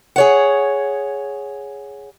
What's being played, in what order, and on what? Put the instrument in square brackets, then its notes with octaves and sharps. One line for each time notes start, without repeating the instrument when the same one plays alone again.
[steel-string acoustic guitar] G#4 C#5 F#5